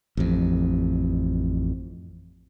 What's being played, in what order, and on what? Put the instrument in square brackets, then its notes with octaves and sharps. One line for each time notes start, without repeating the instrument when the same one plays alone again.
[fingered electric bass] A1 F2